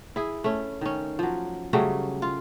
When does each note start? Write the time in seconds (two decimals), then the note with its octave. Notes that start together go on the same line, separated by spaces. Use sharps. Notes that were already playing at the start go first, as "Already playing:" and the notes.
0.16 E4 G#4
0.44 A3 C#4
0.81 D#3 C#4
1.19 F3 F#3
1.73 C#3 F#3 G3 A3
2.22 F4